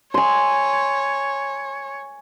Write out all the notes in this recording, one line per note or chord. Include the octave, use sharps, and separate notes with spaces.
C#5 G#5 C6